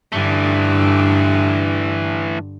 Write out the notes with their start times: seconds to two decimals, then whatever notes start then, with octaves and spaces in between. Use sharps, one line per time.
0.12 G2 D3 E3 A3